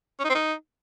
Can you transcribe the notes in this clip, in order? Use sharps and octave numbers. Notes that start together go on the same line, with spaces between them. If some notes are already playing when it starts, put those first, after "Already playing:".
C#4
D#4
C4
D#4